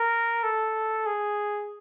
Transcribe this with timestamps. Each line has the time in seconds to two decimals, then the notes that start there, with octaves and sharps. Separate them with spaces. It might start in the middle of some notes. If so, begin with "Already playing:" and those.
Already playing: A#4
0.43 A4
1.06 G#4